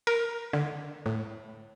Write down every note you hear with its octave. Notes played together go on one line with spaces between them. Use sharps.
A#4
D3
A2